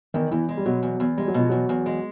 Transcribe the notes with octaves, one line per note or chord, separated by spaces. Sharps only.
E2 D#3
E2 E3
G#3
G3
B2 F#3
E2
E2
G3 G#3
F#3
B2 F3
E2 F#3
E2
G#3